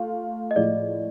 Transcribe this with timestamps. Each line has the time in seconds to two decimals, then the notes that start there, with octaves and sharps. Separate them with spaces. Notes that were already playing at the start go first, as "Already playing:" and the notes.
Already playing: A3 F4 A4
0.51 D#5
0.56 A2 F3 G#3 D5